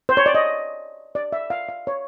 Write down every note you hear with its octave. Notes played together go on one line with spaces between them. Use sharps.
C5
C#5
D5
D#5
D5
E5
F5
F5
C#5